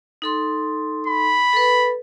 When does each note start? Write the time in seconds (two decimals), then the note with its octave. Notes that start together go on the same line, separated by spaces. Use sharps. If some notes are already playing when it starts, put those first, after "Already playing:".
0.22 D#4 A4 C6
1.07 B5
1.53 A4 B4